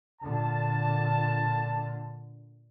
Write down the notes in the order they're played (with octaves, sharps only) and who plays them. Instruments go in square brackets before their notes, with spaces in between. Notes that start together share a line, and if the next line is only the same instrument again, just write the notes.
[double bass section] A#2 D3 [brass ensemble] A5